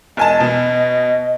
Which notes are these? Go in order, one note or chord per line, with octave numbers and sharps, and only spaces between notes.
E1 D#5 G#5 A5
B2